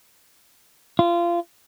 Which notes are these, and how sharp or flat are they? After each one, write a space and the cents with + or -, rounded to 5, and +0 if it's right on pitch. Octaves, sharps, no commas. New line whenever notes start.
F4 -25